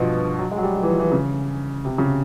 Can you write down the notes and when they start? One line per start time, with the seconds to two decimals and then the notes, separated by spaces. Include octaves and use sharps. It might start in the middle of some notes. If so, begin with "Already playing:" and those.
Already playing: G2 B2 F3
0.38 F#3
0.51 G#3
0.57 F#3
0.63 G3
0.75 F#3
0.83 E3
0.87 F3
0.99 E3
1.12 C#3
1.85 C3
1.98 C#3